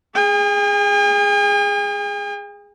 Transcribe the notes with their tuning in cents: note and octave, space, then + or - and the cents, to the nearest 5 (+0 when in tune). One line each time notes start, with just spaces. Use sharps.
G#4 -10 G#5 -45